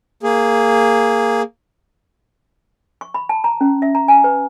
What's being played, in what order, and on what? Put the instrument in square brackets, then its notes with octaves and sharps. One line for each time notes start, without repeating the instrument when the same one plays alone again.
[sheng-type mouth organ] A#3 G#4
[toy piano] C#6
B5
A5
A#5
C#4
E5
A#5
G#5
B4